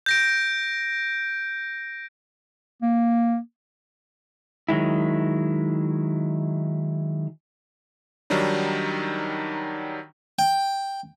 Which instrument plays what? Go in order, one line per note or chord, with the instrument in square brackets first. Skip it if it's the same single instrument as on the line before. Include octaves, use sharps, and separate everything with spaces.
[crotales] G6 A#6 D7
[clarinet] A#3
[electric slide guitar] D#3 F#3 G#3 E4
[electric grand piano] D#3 F#3 G3 D4 D#4
[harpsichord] G5